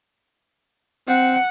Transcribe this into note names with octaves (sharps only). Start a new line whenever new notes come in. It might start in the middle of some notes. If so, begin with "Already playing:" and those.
C4 F#5